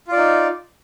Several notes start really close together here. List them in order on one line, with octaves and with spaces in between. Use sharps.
F4 D5 D#4